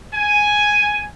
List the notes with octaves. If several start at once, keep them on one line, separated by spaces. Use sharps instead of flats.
G#5